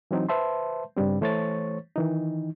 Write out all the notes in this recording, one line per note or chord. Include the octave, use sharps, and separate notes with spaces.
E3 F#3 C4 D#4
B4 C5 E5 A5 C6
G2 C#3 G3 C4
E3 A3 C5 C#5 C#6 A6
D#3 E3 D#4